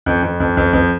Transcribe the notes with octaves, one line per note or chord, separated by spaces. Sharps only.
F2
F2
F2
F2
F2